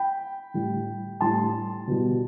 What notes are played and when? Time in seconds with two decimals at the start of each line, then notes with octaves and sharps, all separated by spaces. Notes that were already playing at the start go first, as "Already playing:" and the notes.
Already playing: G5 B5
0.54 A2 G3
1.21 A2 G3 A5 C6
1.87 B2 G3